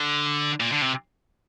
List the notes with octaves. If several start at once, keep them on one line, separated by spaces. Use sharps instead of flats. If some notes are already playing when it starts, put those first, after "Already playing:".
Already playing: D3
A#2
D3
C3